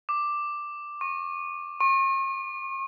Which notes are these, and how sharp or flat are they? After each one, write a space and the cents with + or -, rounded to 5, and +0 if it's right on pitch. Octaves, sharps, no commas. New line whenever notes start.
D6 +5
C#6 -25
C#6 -45